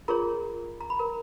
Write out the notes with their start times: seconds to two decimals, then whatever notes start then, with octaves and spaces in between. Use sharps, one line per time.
0.08 F4 G#4 A#4 C#5 A#5
0.81 A#5
0.90 B5
0.99 A#4 A#5